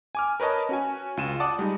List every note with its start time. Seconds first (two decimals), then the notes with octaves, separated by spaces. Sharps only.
0.15 G#5 D6 F6
0.40 A#4 B4 C#5 D#5 A5
0.69 C#4 F#4 G#5
1.17 C#2 F4 D#7 E7
1.40 D5 F#5 A5 D6 D#6
1.59 G3 G#3 D#4